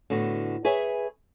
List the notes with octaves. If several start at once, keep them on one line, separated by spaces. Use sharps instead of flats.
A2 D3 B3 F#4
G#4 B4 C#5 E5 G#5